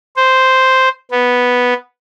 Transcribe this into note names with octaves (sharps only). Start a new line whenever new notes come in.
C5
B3